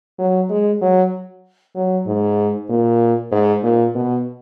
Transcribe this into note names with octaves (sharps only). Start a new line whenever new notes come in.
F#3
G#3
F#3
F#3
G#2
A#2
G#2
A#2
B2